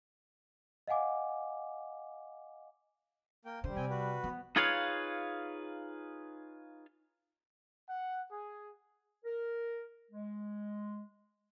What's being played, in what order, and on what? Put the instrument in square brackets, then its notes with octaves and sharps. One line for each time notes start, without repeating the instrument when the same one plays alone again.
[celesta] D#5 F5 F#5 G#5 D6
[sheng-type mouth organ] A#3 G5
[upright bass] D3 [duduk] G3 [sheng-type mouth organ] C5
[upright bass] C3 [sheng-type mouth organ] C4 G5 G#5
[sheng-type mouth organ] F#4 B4
[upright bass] F3 [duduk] B3
[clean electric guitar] D#4 F4 G#4 B4 C#5 F5
[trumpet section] F#5
G#4
[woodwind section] A#4
G#3